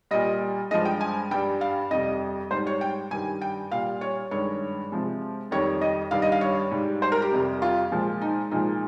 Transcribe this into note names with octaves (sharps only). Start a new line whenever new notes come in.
A#2 G3 D#5
G2 F3 G#3 D#5
G5
G#5
G2 G3 G5
F5
F2 C3 G3 D#5
G#2 G3 C5
C#5
G5
G2 D#3 G3 G#5
G5
A#2 G3 F5
C#5
G2 D#3 G#3 C#5
C3 F3 G#3
F2 D#3 G3 C#5
D#5
G2 D#3 G3 F5
D#5
F5
C#5
G#2 G3
C5
A#4
G4
F2 C3 G3
F4
A#2 F3 G#3
D#4
A#2 F3 G#3 D#4